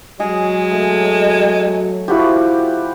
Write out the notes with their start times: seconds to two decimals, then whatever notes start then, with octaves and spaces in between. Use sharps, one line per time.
0.20 F#3 G#3 G#4
0.71 A3
2.08 F3 E4 F#4 G4